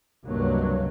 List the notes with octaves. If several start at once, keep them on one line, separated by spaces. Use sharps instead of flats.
C#2 G2 C3 F#3 A#3